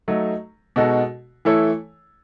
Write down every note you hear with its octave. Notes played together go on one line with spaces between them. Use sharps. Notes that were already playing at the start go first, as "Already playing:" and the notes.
F#3 A3 D#4
B2 G#3 D#4 F#4 A4
E3 A3 E4 A4 C#5